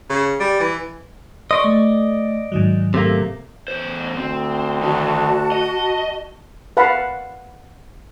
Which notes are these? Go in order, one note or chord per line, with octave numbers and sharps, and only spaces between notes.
C#3
G3
E3
D5 D#5 C6 C#6
A3
G#2 D#3 F#3
C3 A3 A#3
E2 C5
D2 C4
D#3 D4 F#4 A5
D#5
B4 F5 F#5 A5 B5